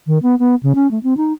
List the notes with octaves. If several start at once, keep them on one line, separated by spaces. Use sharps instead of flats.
D#3
B3
B3
C#3
C#4
A3
C4
D#4